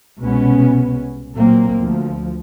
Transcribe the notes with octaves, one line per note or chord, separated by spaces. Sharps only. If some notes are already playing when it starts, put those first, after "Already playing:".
C2 B2 G#3 B3 C#4
A#2 F#3 A#3 C4
D2 F3